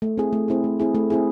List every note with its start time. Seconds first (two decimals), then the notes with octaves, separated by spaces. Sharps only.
0.02 A3
0.17 C4 E4 G#4
0.33 A3
0.48 C4 E4 G#4
0.64 A3
0.80 C4 E4 G#4
0.95 A3
1.10 C4 E4 G#4